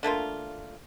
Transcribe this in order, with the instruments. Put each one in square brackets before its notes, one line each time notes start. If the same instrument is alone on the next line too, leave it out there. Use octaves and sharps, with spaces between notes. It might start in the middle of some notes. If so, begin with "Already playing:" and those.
[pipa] D3 A3 A#3 F4